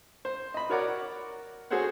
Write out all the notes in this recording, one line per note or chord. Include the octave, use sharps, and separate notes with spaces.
C5
D#5 B5
F#4 A#4 C#5 D5 F#5 D6
F#4 G#4 A4 C5 C#5 F#5